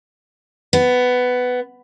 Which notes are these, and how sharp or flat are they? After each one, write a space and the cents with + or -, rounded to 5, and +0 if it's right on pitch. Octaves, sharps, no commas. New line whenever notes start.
B3 +10